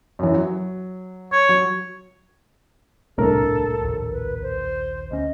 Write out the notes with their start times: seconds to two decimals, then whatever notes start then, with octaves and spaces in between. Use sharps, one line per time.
0.19 F#2 E3
0.34 F#3
1.32 C#5
1.49 F#3
3.18 D#1 C2 A2 A3 D4 A4 A#4
3.81 A#1 D#2
4.12 B4
4.42 C5
5.11 D2 C#4 D#5